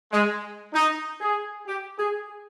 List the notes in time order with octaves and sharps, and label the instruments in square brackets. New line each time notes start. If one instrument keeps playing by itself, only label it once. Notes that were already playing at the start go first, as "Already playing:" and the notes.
[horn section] G#3
D#4
G#4
G4
G#4